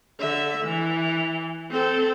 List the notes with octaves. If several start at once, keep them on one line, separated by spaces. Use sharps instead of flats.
D3 E5
E3
C4 A4